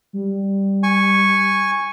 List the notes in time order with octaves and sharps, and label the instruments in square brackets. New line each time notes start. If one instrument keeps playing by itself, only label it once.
[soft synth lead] G3
[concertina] G#5 C#6